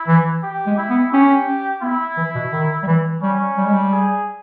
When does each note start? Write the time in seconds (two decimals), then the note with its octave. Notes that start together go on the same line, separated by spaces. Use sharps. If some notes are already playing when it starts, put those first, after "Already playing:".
Already playing: E4
0.08 E3
0.43 G4
0.66 G#3
0.78 E4
0.90 B3
1.12 C#4 G4
1.82 B3 E4
2.17 E3
2.35 B2
2.52 D#3
2.83 G3
2.87 E3
3.22 G3 C#4
3.58 G3
3.66 G#3
3.74 G3
3.92 G#4